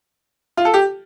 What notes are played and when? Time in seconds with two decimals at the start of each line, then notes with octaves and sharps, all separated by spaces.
0.57 F4
0.65 A4
0.74 G4